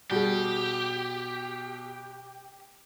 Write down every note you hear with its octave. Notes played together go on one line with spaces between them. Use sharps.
B2 G3 G4 G#4